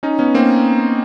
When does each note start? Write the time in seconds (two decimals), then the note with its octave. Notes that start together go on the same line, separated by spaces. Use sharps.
0.03 C#4 D#4
0.19 B3 C#4
0.34 A#3 C4